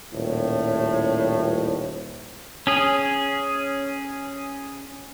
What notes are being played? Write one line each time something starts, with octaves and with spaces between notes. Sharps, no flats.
D#1 A2
C#4 G#4